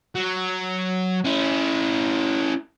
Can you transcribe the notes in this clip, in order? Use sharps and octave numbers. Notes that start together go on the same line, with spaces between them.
F#3
C#4 E4